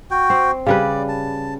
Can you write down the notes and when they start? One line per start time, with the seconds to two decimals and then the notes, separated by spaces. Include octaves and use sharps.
0.11 F#4 G5
0.30 C4
0.67 C#3 G3 B4 D5
1.08 A5